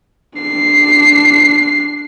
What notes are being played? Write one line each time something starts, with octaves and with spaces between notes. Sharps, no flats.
D4 C7